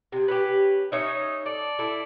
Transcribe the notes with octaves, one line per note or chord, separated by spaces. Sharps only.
C3 G#4
C#4 D#4 G4 B4
C#4 D#4 C#5 E5
A4 D5
E4 A4